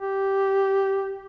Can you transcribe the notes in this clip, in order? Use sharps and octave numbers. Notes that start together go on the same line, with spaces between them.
G4